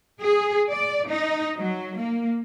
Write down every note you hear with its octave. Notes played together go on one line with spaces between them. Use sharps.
G#4
D5
D#4
F#3
A#3